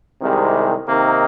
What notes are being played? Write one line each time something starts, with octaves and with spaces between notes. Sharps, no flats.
C2 C3 D#3 G#3
C3 D#3 A#3 D#4